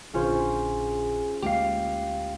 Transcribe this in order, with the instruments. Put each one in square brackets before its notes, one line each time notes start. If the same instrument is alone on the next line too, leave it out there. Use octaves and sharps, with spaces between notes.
[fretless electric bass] A#1 D3 [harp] C#4 F4 C5 [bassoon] G#4
[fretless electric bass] D2 G#3 A#3 [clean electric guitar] G4 F5